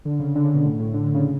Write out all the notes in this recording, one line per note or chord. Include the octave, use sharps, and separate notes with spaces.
D3
C#3
D3
C#3
B2
A2
A2
D3
D3
C#3